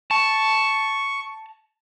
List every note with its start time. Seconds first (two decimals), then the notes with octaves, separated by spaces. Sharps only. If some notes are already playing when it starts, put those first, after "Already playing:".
0.11 A5 C#6